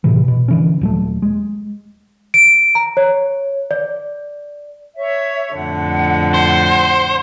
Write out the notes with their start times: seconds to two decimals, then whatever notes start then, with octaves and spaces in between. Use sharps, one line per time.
0.04 A2 C3 E3
0.28 B2
0.48 D3 E3 C#4
0.81 D#1 F#3 A3
1.22 G#3
2.34 D7
2.75 A#5
2.97 C#5
3.71 D5
4.97 C#5 E5
5.54 F2 A2 D3 F#5
6.34 C5